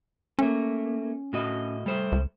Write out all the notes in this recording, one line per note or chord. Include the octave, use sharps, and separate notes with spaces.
A3 A#3 C#4
A2 F#4 D#5
G3 A3 C5
C#2